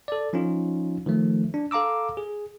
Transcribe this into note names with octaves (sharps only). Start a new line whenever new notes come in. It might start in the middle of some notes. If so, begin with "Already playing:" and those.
A4 D5
F3 C#4 D#4 F4
D#3 F3 A3
D4
A4 F5 A#5 D6 E6
G#4